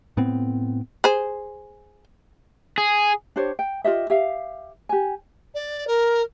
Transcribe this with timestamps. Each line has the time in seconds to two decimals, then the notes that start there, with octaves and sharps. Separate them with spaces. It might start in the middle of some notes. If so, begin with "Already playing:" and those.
0.17 A2 B3 C4
1.04 G#4 C5
2.78 G#4
3.36 D4 G4 C5 C#5
3.59 G5
3.84 F4 G4 D#5 E5
4.10 G4 E5 F5
4.89 G4 G#5
5.54 D5
5.87 A#4